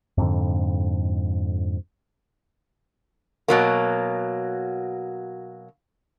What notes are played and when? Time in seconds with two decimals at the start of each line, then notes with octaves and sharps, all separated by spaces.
0.18 F2 G#2 D3
3.48 B2 F#3 A#3